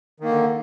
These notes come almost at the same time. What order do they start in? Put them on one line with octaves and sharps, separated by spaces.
D#3 A#3 D3